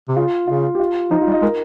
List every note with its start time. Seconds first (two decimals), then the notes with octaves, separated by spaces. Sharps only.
0.09 C3
0.16 C#3 F4
0.47 C#3 F4
0.75 G4
0.79 F4
1.11 F3 D#4
1.22 F4
1.27 G3
1.32 D#5
1.42 G#3 A#4